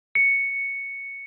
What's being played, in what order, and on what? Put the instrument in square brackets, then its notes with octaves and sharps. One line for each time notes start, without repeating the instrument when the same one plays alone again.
[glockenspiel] C#7